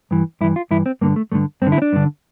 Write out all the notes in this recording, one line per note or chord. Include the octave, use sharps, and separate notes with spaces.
G2 E3
G2 E3 E4
F4
G2 E3 E4
C4
G2 D3 A#3
A3
G2 D3 A3
G2 C4
D3
E4
C4
D4
G2 D3